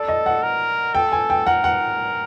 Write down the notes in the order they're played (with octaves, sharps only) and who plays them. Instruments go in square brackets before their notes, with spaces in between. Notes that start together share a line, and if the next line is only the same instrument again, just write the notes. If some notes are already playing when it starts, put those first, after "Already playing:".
Already playing: [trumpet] A4 [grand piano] D5
[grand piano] D#5
F#5
[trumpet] A#4
[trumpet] A4 [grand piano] G5
[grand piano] G#5
G5
[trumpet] A#4 [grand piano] F#5
[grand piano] F#5